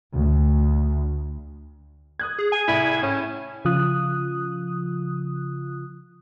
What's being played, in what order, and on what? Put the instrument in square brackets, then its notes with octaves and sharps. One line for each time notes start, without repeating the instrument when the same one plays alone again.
[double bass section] D2
[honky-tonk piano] D#6 F#6 G#6
[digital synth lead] G#4
[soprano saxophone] G#5
[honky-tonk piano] C2 A2 [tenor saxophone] E4 [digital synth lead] G#6
[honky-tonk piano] A2 [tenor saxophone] C#4
[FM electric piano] C#3 F3 F4 D#6 F#6